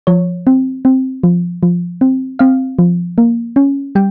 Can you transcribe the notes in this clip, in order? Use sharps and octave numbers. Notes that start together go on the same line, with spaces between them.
F3 C#5
C4
C4
F3
F3
C4
C4 F5
F3
A#3
C#4
G3 G5